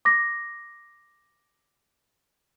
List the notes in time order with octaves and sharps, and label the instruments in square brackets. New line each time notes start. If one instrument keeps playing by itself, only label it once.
[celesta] D6 A#6